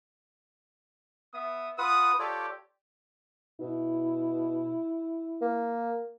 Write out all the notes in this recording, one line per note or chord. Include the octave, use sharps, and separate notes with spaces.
B3 E5 D#6
F4 B4 F#5 D#6
F4 G4 A4 C#5 D5
B2 E4
A#3